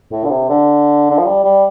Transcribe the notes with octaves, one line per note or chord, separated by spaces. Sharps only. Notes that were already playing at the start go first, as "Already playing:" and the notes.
A2
D3
C3
D3
D3
F3
G3
G3